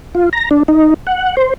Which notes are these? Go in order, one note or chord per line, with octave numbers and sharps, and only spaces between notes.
F4
A#5
D4
D#4
F#5
C5